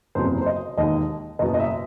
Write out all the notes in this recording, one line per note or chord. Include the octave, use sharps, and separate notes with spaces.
F#1 E2 C3 F#3 C5
C5
D#5
E1 D#2 D#3 D#5
F#1 E2 B2 D#5
D#5
E5